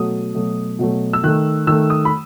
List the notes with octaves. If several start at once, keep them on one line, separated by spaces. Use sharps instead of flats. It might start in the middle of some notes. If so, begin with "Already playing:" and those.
Already playing: B2 F#3 A3 D#6
B2 F#3 A3
B2 F#3 A3
E6
D#3 A3 F#6
D#3 A3 E6
D#6
B5